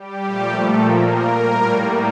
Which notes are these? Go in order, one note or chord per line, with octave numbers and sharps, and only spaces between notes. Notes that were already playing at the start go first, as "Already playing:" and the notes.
Already playing: G3 G4
A#2 F3 A3
A3 A4
A#3 A#4
A#3 A#4
A2 G3 A#3